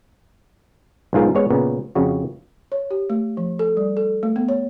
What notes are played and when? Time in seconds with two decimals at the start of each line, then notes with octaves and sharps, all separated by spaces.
1.13 B1 G#2 F4 A#4
1.35 G#3 B3 C#5
1.50 A#2 C#3 B3
1.95 F2 C#3 F#4
2.72 C#5
2.91 G4
3.10 A3
3.37 F3
3.59 A4
3.77 G3
3.97 A4
4.23 A3
4.36 B3
4.49 C#5